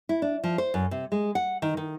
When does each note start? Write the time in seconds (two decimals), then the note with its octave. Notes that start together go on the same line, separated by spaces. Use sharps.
0.09 E4
0.22 D4
0.44 F3
0.58 C5
0.74 F#2
0.91 C3
1.12 G#3
1.35 F#5
1.62 D#3
1.77 D#3